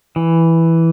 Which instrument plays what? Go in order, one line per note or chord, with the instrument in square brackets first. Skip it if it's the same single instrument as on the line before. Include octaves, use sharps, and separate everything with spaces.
[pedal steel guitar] E3